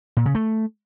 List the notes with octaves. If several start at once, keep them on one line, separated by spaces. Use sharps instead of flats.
A#2
C#3
A3